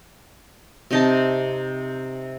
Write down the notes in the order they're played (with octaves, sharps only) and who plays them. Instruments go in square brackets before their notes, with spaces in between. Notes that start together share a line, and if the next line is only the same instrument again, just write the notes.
[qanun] C3 D#4 A5